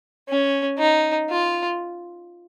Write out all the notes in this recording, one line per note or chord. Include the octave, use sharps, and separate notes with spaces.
C#4
D#4
F4